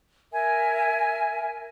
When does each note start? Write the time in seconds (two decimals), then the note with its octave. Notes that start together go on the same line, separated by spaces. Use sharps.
0.32 A#4 E5 G#5